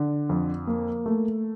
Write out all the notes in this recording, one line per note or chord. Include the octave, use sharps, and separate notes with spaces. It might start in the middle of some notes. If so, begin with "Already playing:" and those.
Already playing: D3
F2
A#3
A3